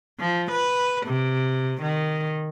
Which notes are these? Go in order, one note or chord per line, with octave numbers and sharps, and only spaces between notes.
F3
B4
C3
D#3